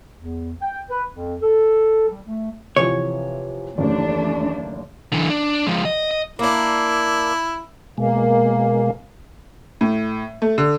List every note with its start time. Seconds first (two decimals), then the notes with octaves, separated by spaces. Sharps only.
0.17 E2
0.62 G5
0.89 B4
1.12 F2
1.42 A4
2.09 G3
2.26 A3
2.76 C3 E3 F3 C#5
3.78 F#1 D#2 E3 A3 D4
5.12 D3 E3
5.30 D4
5.67 F3 G#3
5.85 D#5
6.11 D#5
6.39 A#3 D4 E4
7.98 B2 G#3 A#3
9.81 A2
10.42 A3
10.58 D3